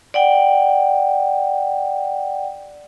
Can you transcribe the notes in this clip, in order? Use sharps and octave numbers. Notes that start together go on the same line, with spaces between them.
D5 F#5 G5